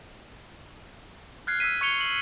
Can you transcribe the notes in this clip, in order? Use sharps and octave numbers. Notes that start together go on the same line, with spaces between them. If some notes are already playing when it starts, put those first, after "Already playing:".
F6 F#6 G#6 C7
E6 F6 G#6 B6 D#7
C#6 G#6 C#7 F7 G7
F#7